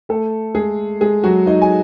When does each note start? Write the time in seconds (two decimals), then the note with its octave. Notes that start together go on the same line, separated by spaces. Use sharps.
0.09 A3 A4
0.55 G#3 G#4
1.01 G#3 G#4
1.24 F#3 F#4
1.46 D#4 D#5
1.62 G#5